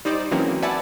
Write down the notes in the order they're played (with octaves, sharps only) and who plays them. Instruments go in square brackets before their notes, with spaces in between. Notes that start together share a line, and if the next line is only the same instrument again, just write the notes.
[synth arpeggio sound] G3 D#4 C5 D5
E3 F#3 G#3 A#3 C4 C#4
B4 D5 E5 F#5 G#5 A5